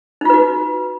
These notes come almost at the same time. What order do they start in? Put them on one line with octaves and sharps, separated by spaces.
D#4 F4 B4 F#4